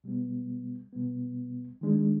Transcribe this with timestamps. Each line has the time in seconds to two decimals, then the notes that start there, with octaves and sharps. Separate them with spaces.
0.04 B2 G3 B3
0.93 B2 G3 B3
1.81 D#3 G#3 D4